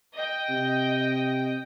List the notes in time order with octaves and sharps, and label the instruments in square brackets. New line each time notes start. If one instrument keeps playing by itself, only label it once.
[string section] D#5 G5
[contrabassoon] C3